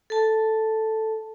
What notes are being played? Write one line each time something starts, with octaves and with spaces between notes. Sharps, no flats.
A4 A5